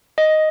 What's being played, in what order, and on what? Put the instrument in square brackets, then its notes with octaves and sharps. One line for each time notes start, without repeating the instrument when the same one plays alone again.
[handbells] D#5